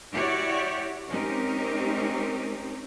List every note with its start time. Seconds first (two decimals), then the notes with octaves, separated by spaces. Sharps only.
0.13 E4 F#4 G4 C#5 D5
1.08 G#3 C4 C#4 D#4 G4 A#4